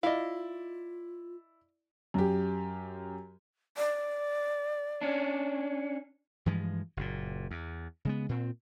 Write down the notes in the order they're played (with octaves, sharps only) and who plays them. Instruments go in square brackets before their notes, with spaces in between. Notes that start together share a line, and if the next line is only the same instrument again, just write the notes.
[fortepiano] E4 D5 [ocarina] F4 [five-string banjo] D#5 F5
[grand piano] F#2 G4
[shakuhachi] D5
[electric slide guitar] C#4 D4
[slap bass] G2 E3 F3 G#3
F#1 A#2
E2
C#3 G#3 B3
A#2 C4